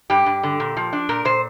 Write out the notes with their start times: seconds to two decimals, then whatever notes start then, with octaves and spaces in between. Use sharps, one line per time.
0.10 G2 G4
0.26 G2
0.43 D3
0.60 A#2
0.77 F3
0.93 D4
1.09 A#2 A#4
1.25 A#2 C5